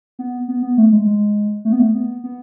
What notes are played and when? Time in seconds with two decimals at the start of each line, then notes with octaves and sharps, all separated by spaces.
0.19 B3
0.48 B3
0.62 B3
0.77 A3
0.92 G#3
1.06 G#3
1.65 A3
1.72 B3
1.80 A3
1.95 B3
2.24 B3